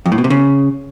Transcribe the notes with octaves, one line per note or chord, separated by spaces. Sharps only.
F2
A2
B2
C3
C#3